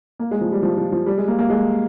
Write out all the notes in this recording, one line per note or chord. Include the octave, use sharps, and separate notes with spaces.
A#3
G#3
F3
G3
F3
F3
F3
G3
G#3
A#3
A#3
G#3